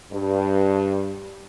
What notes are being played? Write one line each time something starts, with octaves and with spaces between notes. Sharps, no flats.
G2